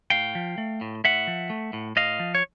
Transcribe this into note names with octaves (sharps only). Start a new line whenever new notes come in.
A2 F5 G5
F3
A3
A2
A2 E5 F#5
F3
A3
A2
A2 D#5 F5
F3
C#5